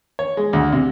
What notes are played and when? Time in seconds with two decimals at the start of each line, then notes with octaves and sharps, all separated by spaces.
0.19 C#5
0.37 G#3
0.53 D2
0.72 C3